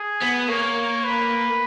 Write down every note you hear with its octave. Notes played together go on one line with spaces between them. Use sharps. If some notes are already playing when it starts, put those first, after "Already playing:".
Already playing: G#4
B3
A#3 C#5
B4